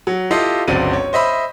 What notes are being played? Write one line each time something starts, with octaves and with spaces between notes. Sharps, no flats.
F#3
E4 F4 G4 A4 D#5 F5
G1 C#2 F#3 C4 D5 D#7
C#5
C5 D#5 E5 B5